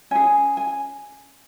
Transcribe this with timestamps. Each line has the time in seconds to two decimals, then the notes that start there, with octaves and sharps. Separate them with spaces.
0.11 C#4 G#4 G#5
0.57 G#5